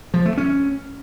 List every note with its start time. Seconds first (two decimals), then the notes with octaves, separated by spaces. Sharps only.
0.14 F3
0.26 A3
0.37 C#4